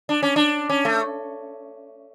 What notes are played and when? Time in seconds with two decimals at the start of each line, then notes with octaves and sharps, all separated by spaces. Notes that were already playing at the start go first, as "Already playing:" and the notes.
0.09 D4
0.23 C#4
0.36 D4
0.70 C#4
0.85 A3